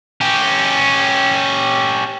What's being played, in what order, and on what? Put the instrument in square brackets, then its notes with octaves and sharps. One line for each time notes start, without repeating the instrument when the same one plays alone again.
[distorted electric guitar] C#4 G4